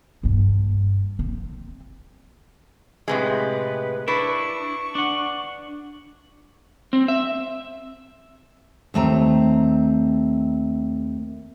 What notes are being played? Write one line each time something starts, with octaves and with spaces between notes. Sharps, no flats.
F#1 G2
C4
A2 C3 G#3 B4
D4 E4 B4 C#6
D4 F#5
C4
E5
D#2 A3 C4 A#5